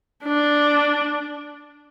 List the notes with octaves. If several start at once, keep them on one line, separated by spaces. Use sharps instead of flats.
D4